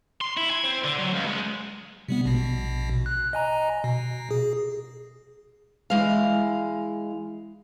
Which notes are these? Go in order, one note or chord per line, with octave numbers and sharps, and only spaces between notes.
C6
E4
G#5
C4
D3
F#3
C#2
G#3
C3 G3 B3
A#1 B2
F#6
D#5 G#5 A#5
B2
G#4
E3 G#3 F5